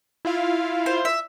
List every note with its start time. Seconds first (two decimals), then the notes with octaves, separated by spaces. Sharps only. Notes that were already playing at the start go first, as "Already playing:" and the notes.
0.25 E4 F4 F5
0.86 C5
1.05 E5